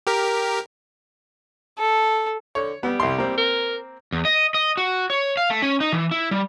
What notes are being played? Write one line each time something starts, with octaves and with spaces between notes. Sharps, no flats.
G4 A#4
A4
D3 C#5
G3 B3
C2 C6
A#3 C4
A#4
E2
D#5
D#5
F#4
C#5
F5
A3
C#4
D#4
E3
E4
G3